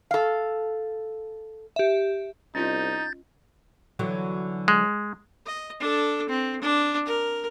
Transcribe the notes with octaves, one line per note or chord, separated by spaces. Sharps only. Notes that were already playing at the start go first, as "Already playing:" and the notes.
A4 F5
G4 E5
C2 C#4 D#4 F4 D#5 G6 A6
D3 E3 F#3
G#3
D#5
D4 A4
C4
D4
A#4